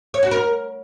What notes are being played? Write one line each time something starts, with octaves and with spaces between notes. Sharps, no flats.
C#5
F#4
A#4